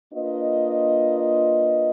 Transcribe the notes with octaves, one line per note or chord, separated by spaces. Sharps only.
A#3 D4 F4 B4 D#5